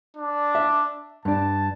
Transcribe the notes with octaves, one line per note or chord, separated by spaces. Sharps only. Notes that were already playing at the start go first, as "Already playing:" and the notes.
D4
E5
G2 D4 A5